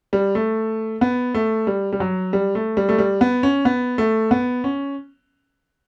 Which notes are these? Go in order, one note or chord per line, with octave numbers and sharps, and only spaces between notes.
G3
A3
B3
A3
G3
G3
F#3
G3
A3
G3
A3
G3
B3
C#4
B3
A3
B3
C#4